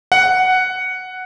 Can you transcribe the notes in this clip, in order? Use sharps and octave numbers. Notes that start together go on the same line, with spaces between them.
F#5